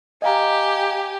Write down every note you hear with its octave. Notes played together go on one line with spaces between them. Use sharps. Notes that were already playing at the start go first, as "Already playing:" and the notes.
G4 D#5 F5 G#5 A#5